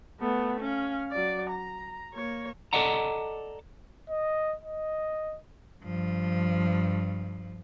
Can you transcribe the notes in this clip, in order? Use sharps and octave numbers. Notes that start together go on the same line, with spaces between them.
A3 B3
C#4 F5
F#3 D5
A#5
A#3 C#5
A4 C5 D5 D#5 F#5 A#5
D#5
D#5
G2 F3